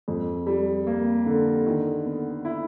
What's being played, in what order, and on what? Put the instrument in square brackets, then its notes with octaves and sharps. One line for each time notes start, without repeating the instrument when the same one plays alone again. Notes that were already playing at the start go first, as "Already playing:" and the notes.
[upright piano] F2
G3
A#3
D3
D#3
B3
E4